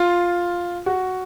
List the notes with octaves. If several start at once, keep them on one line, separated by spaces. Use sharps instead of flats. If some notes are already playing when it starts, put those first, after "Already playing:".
Already playing: F4
F#4